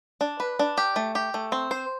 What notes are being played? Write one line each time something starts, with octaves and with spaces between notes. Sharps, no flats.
D4
B4
D4
G4
A3
G4
A3
C4
C5